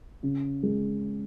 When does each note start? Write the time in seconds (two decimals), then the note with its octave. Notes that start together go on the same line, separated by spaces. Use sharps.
0.23 C#3
0.63 G#3